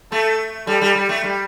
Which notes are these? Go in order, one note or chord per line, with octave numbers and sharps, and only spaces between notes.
A3 A4
G3 A4
G3
G3
A3
G3